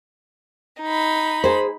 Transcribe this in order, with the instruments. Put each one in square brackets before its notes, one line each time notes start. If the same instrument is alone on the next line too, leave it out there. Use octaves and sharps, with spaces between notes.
[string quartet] D#4 B5
[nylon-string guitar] G#4 C5